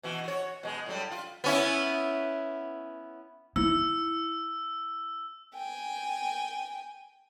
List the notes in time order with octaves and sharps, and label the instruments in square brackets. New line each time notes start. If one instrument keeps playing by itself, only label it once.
[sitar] B2 E3 F#4
F#4 C#5
B2 G#3 G#4
A2 F#3 G3
F4
B3 C#4 E4
[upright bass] E4 [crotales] E6
[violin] G5 G#5